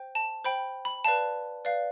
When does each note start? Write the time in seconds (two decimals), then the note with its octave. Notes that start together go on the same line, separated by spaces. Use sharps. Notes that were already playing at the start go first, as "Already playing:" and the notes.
Already playing: C5 G5
0.15 A5
0.44 C5 G5 B5
0.85 B5
1.05 B4 D5 F5 A5
1.65 B4 D5 F5